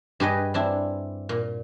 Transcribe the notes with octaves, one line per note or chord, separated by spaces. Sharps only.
G2 G4 G#4 B4 D#5
C4 D4 E4
A#2